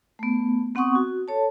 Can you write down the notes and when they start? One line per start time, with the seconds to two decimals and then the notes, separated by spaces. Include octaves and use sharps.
0.19 A3 B3
0.75 B3 C4 F#5 C6 C#6 D#6
0.95 F#4
1.28 A4 C#5 A5